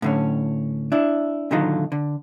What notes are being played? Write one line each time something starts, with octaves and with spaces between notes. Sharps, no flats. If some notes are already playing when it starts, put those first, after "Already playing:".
A2 D3 C#4
D4 E4
A#2 D3 D#3 F#3 D#4 F4
D3